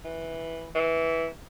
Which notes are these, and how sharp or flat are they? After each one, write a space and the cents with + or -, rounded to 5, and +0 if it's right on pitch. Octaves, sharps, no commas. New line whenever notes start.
E3 -5
E3 -10